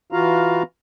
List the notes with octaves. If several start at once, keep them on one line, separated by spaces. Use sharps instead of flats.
E3 F4 F#4 F5 A#5